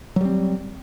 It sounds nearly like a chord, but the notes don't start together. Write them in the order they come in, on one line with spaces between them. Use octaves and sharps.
F#3 G3 C4